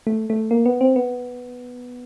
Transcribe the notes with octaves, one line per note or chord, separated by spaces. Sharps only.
A3
A3
A#3
B3
C4
B3